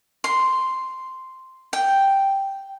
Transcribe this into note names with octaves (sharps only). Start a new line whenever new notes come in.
C6
G5